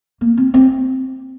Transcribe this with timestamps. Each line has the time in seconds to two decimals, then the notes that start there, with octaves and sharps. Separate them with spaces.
0.21 A#3
0.37 C4
0.54 C4